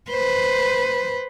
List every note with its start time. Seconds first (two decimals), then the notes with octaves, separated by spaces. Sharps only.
0.10 B4 C5